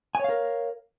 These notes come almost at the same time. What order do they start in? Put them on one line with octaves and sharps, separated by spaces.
G#5 C#5 F5 A#4